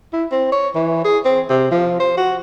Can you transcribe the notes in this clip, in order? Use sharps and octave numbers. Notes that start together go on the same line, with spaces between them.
E4
C4
C#5
E3
G#4
C4
C3
F3
C5
F#4